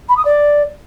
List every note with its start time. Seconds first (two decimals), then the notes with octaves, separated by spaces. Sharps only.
0.09 B5
0.17 D#6
0.25 D5